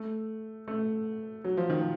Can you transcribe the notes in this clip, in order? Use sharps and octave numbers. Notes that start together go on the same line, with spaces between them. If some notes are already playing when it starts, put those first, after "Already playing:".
Already playing: A3
A3
F#3
F3
D#3
F3